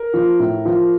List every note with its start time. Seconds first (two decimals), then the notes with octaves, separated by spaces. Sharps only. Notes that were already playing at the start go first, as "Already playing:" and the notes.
Already playing: A#4
0.14 F3
0.40 A2
0.65 F3